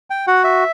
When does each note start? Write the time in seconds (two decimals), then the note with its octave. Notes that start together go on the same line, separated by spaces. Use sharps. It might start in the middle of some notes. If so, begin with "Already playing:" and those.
0.10 G5
0.27 F#4 F#5
0.44 E5